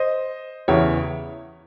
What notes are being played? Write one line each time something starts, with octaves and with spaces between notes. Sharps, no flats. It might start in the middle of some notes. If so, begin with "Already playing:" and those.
Already playing: C5 D#5
E2 C#3 E3 C#5 E5